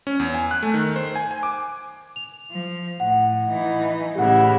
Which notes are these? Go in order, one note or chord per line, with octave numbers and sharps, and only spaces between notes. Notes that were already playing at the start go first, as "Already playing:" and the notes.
C#4
E2
G#5
F#6
A3
D#3
C5
G#5
G#5
D6
F7
F3
A2 F#5
E3 D#4
A2 C#3 E3 G4 F#5